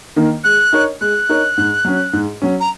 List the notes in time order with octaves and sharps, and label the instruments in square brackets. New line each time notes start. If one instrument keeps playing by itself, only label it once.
[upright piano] D#3 A#3 D#4
[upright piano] G#3 [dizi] F#6
[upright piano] D#4 A#4 C#5
[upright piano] G#3 [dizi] F#6
[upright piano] D#4 A#4 C#5
G#2
F#3 C#4
G#2
F#3 C#4
[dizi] A#5